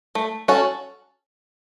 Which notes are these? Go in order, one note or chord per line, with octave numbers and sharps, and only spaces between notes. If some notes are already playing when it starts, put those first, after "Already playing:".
A3
C#4 F#4 A4